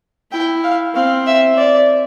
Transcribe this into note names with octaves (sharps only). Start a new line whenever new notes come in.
E4 G5
F5
C4 F5
E5
D5